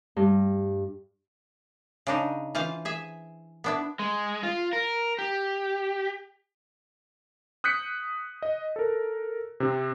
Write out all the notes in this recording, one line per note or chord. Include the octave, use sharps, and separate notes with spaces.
G2
C#3 D4 D#4
E3 F4 C5 F5
G#4 E5
B3 D4 E4
G#3
F4
A#4
G4
D#6 F#6 G6 B6 C#7
D#5
A4 A#4
C3 C4